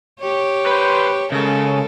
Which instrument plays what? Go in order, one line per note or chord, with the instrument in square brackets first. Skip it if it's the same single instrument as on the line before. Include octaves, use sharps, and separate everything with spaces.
[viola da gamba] G4 C#5
[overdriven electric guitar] B4 C5
[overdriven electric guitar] C#3 [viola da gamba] G#3 A4 A#4